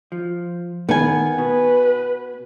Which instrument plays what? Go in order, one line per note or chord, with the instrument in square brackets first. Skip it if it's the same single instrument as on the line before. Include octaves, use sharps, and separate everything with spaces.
[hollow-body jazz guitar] F3
[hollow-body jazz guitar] D#3 [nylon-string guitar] B3 G#5
[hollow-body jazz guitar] B2 [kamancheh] B4